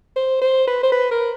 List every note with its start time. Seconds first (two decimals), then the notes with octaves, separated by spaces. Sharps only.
0.16 C5
0.42 C5
0.67 B4
0.83 C5
0.92 B4
1.11 A#4